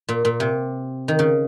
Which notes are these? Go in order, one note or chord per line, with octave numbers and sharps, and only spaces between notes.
A#2
A#2
C3
D#3
C#3